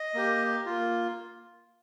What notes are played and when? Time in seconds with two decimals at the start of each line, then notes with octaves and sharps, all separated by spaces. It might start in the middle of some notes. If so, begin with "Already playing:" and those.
Already playing: D#5
0.14 A#3 G4
0.66 A#3 F4